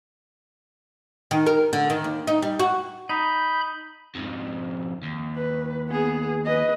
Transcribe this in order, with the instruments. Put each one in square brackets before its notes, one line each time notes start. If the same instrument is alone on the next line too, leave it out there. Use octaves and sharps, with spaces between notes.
[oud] D#3
A#4
D3
D#3
D#2
D#4
G3
F#4
[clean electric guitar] D#4 [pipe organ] B5 G6
[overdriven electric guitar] F2 G#2
D#2
[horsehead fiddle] B4
B3 G#4
B4 D#5